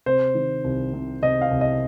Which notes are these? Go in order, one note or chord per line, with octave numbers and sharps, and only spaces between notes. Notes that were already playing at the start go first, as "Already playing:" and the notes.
C3 C5
D#3
C2
C3
C3 D#5
F5
C2
D#5